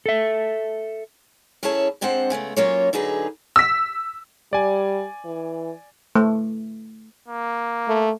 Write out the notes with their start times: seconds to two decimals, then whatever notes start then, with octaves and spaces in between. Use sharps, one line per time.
0.06 A4 E5
1.63 F#2 C#4 E4 G#4 C#5 A5
2.01 F2 G#3 C4 D4 C5 F#5
2.30 C#3 G#3 A3 B3
2.56 F#3 A#3 C#4 F4 C#5
2.93 D3 F#3 D#4 G#4 B4
3.56 E6 B6
4.53 G3 D5 G#5
5.25 E3
6.15 A3
7.28 A#3
7.88 A3